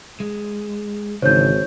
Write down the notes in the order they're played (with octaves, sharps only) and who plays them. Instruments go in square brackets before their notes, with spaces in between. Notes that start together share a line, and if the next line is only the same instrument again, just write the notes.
[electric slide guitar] G#3
[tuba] G#1 [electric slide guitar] C#3 E3 [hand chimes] D#4 C#5 [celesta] C5 G6